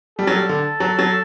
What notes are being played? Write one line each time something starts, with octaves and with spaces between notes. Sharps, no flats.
G3 A4
F#3
G3
D3
F#3
F#3